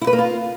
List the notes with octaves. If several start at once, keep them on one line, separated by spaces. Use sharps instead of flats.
E4
B4
A#3
F4